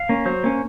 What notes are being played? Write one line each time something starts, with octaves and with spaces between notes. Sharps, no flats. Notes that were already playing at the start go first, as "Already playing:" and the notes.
Already playing: F5
A#3 C#4
F#3 C5
A#3 C#4